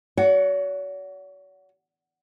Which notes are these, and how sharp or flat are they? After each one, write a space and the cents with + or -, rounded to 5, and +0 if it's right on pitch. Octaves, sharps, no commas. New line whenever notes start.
F#4 +5 C#5 +45 F#5 +0